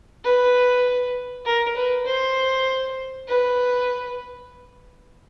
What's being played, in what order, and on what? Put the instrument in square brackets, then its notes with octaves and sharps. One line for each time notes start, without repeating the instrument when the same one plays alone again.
[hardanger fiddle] B4
A#4
B4
C5
B4